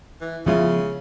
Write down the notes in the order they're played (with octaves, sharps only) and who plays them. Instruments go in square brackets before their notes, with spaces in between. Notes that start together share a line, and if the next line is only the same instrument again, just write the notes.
[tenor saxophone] E3
[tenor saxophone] C#3 [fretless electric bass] F3 G#3 B3 [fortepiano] E4 F4